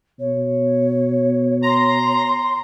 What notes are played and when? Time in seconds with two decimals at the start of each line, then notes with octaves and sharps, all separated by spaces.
0.20 B2 C#5
1.63 A#5 C6